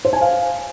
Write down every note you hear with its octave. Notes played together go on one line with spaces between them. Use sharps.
C5
G#5
F5